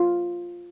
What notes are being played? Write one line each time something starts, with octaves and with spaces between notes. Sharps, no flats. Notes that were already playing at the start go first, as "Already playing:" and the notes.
Already playing: F4